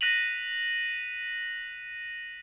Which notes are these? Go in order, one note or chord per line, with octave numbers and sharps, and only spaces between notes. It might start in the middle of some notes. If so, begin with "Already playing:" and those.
F#6 A#6 B6 D#7 F7 F#7